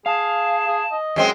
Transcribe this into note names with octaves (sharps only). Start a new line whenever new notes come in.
G#4 F5 A5
G#4
D#5
F#2 G#3 C4